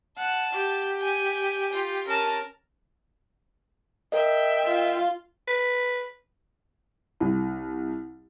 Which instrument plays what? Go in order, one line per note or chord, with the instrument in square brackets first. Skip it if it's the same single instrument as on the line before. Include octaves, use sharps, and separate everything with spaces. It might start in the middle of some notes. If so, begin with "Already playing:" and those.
[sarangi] F#5 [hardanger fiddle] A5
[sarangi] G4
[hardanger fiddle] G#5
F4
[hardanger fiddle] C#4 A5 [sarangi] A#4
[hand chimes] A#4 D#5 [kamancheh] E5 G5
[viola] F4
[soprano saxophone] B4
[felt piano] C2